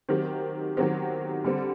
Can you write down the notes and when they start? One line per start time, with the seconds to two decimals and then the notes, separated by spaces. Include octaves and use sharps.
0.09 D#3 F#3 C4 G4
0.77 D#3 F#3 C4 G4
1.44 D3 G3 C4